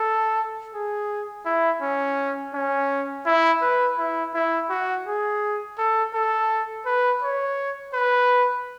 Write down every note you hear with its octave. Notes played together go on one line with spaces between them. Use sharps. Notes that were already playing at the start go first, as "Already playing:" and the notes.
Already playing: A4
G#4
E4
C#4
C#4
E4
B4
E4
E4
F#4
G#4
A4
A4
B4
C#5
B4